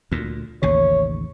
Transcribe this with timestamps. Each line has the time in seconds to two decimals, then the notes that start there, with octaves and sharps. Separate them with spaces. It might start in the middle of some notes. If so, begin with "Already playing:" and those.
0.12 D2 A#2
0.62 A1 D#2 C#3 C#5